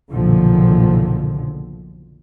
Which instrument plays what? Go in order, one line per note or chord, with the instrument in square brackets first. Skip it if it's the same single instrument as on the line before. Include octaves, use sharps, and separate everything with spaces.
[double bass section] F#1 B1 A#2 D3 D#3 F3